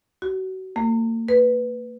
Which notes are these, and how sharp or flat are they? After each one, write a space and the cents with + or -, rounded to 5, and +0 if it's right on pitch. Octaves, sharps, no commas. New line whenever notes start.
F#4 +30
A#3 -40
B4 +0